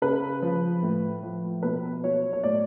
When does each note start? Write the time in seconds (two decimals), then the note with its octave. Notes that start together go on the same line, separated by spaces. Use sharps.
0.02 C#3 B4
0.42 F3
0.83 A2
1.23 F3
1.63 B2 B4
2.03 F#3 C#5
2.33 C#5
2.44 A2 D5